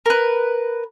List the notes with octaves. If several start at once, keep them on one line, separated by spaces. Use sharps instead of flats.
A#4 B4